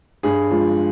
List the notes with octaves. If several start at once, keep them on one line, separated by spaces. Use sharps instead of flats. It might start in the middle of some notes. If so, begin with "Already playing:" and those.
G2 G#4
F3 G#3